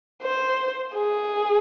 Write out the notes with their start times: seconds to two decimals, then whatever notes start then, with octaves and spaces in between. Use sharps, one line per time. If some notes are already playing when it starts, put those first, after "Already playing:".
0.22 C5
0.94 G#4